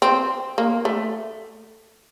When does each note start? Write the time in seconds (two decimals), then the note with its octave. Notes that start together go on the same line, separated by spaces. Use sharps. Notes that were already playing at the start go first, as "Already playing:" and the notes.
0.02 C4
0.58 A#3
0.85 A3